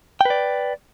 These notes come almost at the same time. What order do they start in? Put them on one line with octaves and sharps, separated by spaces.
G5 B4 D5